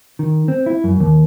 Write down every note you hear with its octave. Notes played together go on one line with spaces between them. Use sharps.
D#3
C4
E4
F#2
D#2